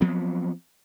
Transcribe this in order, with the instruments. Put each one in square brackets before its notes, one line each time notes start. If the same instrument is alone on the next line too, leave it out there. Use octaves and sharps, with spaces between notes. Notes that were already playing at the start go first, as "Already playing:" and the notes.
[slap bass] F3 F#3 B3 C4